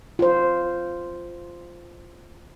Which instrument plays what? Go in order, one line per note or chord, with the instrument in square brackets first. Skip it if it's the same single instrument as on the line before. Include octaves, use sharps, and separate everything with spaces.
[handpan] F4 C5